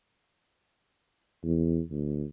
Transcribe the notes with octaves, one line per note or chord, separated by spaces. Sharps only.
E2
D2